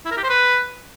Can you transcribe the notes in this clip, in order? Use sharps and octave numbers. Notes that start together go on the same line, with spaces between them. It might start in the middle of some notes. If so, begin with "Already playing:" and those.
E4
A#4
G4
C5
B4